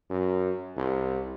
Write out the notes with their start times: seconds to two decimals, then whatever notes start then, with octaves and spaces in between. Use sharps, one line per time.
0.11 F#2
0.77 C2